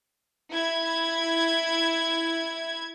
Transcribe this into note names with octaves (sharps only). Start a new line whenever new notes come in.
E4 G#6